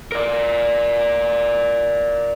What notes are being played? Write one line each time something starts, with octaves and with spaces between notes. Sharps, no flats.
A#4 D5